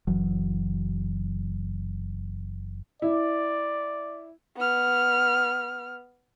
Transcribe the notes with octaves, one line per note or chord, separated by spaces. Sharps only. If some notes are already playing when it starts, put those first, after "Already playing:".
F#1 E3 F#3
E4 D5
B3 F6